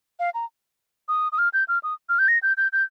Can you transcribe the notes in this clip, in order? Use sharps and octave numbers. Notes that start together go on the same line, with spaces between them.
F5
A#5
D#6
D#6
F6
G6
F6
D#6
F6
G6
A#6
G6
G6
G6